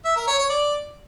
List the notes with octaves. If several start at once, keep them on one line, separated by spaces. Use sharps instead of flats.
E5
A#4
C#5
C#5
D5